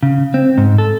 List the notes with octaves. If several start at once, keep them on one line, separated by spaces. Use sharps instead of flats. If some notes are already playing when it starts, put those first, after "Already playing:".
C#3
C4
G#2
A4